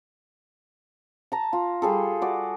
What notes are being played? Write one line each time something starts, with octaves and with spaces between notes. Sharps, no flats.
A5 A#5
F4
G3 G#4 A4
F#4 D5